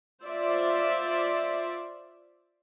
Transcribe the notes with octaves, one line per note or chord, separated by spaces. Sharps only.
F4 C5 D5 E5